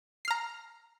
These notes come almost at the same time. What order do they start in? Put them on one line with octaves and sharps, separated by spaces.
C7 F6 A#5